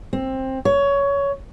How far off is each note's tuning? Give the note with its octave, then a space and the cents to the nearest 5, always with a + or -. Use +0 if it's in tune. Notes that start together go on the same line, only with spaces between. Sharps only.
C4 +15
C#5 +15